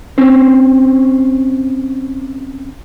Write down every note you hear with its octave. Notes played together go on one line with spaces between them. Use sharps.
C4 C#4 C5